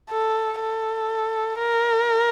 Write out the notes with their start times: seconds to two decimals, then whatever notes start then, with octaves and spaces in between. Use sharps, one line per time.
0.10 A4
0.60 A4
1.59 A#4